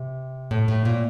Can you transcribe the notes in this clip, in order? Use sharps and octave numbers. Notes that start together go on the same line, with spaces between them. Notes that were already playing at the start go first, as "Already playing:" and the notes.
Already playing: C3
A2
A2
A#2